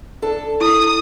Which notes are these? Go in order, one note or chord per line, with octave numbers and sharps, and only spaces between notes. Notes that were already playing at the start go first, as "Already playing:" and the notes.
D4 A4 A5
E4 D#6